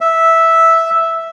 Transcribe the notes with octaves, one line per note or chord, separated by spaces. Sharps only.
E5